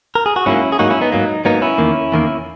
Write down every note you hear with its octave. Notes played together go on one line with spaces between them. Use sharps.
A#4
G#4
F#4
G#2 F#3 A#3 C#4 E4
G#4
G#2 F#3 A#3 D#4 F#4
C#4 E4
B3 D#4
G#2 F#3 A#3
G#2 F#3 A#3 B3 D#4
C#4 E4
E2 D#3 A#3
E2 D#3 A#3